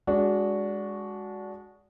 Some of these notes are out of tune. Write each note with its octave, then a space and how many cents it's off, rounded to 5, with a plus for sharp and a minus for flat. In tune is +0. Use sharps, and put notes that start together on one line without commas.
G#3 -15 D4 -20 F#4 +0